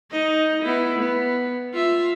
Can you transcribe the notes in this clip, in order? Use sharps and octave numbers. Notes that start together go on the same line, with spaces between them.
D#4 D#5
B3 E4
B3
F4 E5